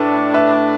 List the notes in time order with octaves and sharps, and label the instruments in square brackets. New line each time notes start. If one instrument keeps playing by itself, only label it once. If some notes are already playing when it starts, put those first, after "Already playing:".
Already playing: [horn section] A2 A3 D4 [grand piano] A4 B4
[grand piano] B4 E5